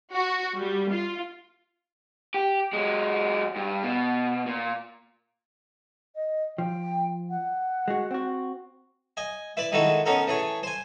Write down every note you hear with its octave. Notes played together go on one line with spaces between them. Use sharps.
F#4
G3
F4
G4
F#3 G#3
G2
B2
A#2
D#5
F3 G5
F#5
G#3 F#4
C4 F#4
D#5 G#5
E4 B4 D5
D#3 G#3 D#4 E4 F#4 A4
B3 C#4 D#4 A4 A#4
E3 A3 G#4 C#5
C5 G#5